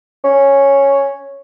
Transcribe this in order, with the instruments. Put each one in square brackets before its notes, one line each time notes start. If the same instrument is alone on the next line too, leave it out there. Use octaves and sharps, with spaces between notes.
[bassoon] C#4